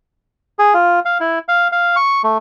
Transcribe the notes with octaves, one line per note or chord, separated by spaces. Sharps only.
G#4
F4
F5
E4
F5
F5
C#6
A3